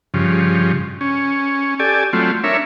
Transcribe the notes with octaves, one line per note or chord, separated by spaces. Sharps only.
G2 C#3 F3
C#4
G4 A4 D5 G#5
F#3 A3 C4 F4
D4 A#4 C#5 E5